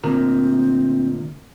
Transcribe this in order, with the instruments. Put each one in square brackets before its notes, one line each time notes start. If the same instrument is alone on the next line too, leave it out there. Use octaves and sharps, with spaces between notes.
[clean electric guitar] D2 A#2 A#4 [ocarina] C4